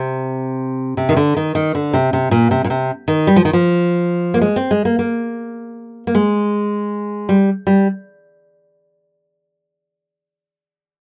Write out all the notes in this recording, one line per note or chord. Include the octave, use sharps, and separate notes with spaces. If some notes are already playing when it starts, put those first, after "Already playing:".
Already playing: C3
C3
D#3
D3
D#3
D#3
D3
C3
C3
A#2
C3
A#2
C3
D#3
G3
F3
D#3
F3
A#3
G#3
C4
G#3
A#3
A#3
A#3
G#3
G3
G3